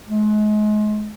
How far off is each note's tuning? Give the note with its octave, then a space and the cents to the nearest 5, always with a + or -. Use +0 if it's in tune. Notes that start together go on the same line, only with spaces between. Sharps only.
G#3 +35